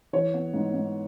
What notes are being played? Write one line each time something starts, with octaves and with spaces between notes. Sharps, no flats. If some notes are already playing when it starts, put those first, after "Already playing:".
E3 C#5
B3
G#2
G#2